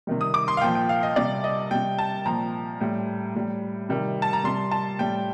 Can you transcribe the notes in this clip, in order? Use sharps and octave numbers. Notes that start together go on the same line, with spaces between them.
C3 D#3 G3
D#6
D6
C6
F5
A#2 F3 G5
G5
F5
D#5
C3 G3 D5
D#5
C3 G3 G5
A5
A#2 F3 A#5
A2 G3
A2 G3
C3 D#3 G3
A5
A#5
C3 G3 C6
A5
A2 G3 G5